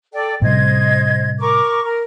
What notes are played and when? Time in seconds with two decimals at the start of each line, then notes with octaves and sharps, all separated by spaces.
0.13 A4 D5 G5
0.42 A2 C3 G3 C5 D#5 G#6
1.40 A#4 C#6 D6
1.84 A#4